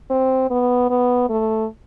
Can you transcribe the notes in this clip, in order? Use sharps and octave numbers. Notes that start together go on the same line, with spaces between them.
C4
B3
B3
A3